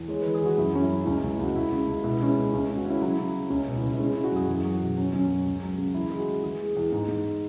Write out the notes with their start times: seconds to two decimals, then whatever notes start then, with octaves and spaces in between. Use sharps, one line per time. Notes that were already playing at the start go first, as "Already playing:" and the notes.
Already playing: E2
0.08 G#3 C#5
0.21 E3 B4
0.34 G#4
0.41 E3 F#4
0.58 F#2 E4
0.74 F#3 C#4
0.82 E4
0.91 F#3
1.02 E4
1.06 C#2 C#4
1.23 C#2
1.31 E4
1.39 C#2 F#4
1.55 C#2 E4
1.72 C#3
1.88 C#2
2.04 B2 E4
2.21 G#3 C#4
2.29 E4
2.36 B2
2.53 C#2 C#4
2.69 C#3
2.77 F#4
2.85 C#3 C#4
2.90 E4
3.02 F#3 E4
3.18 C#3
3.34 F#3
3.50 C#2 C#4
3.67 B2
3.75 E4
3.83 C#2
3.93 E4
3.99 G#3 C#4
4.11 C#3 E4
4.24 F#4
4.32 F#2 G#4
4.48 E2 G#4
4.64 F#3
4.73 F#4
4.81 B2
4.97 F#3 C#4
5.13 F#2 C#4
5.30 F#3
5.46 C#2
5.63 F#3
5.78 C#3
5.94 E2 E4
6.11 G#3
6.19 F#4
6.28 E3
6.43 E3 G#4
6.60 G#3
6.77 E2
6.92 G#2
7.08 G#2